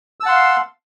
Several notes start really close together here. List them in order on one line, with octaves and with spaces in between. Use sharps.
E6 A5 F#5 C6 F5